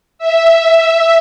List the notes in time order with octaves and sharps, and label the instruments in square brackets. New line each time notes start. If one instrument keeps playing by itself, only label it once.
[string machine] E5